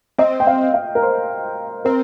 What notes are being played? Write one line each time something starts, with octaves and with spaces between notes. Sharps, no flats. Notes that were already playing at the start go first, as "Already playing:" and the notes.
C4 D#5
G5
F5
F5
A#4
C5
C4 A#4